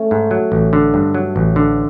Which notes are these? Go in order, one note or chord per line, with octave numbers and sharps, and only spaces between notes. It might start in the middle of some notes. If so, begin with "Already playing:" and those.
Already playing: A3 C#4
G#2
F#3
A1
D3
G2
F#3
A1
D3